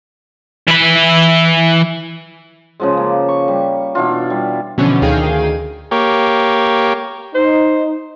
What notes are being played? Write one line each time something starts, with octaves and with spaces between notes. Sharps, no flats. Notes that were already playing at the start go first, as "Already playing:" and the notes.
E3 B5
C#3 F3 G#3
A#3
C#6
G3
B2 E3 D4 F4
G3
B2 D3 E3 F3 B3 C#4
D2 D#3 G#4 F5 G5 D#7
A#3 G4 C#5
D#4 C5